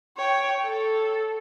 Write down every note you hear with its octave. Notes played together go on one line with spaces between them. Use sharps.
C#5 G5
A4